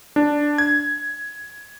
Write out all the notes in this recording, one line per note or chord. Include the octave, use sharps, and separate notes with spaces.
D4
G#6